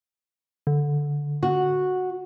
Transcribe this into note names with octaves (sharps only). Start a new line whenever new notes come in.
D3
F#4